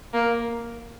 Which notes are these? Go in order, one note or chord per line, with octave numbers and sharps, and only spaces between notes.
A#3